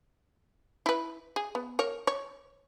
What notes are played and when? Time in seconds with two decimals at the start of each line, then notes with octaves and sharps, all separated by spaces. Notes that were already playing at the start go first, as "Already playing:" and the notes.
0.86 E4 B4
1.36 G#4
1.55 B3
1.79 A#4 C#5
2.07 C#5